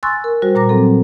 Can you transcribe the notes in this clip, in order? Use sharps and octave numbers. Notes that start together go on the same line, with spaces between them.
G#5 C6 C#6 E6 F#6 A6
A#4
G3 F#4 C5
A#2 A#5 D6 A#6
F#3 C4 A4